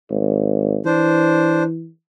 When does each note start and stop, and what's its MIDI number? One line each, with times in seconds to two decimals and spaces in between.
0.11 0.79 32
0.86 1.89 52
0.86 1.63 62
0.86 1.63 72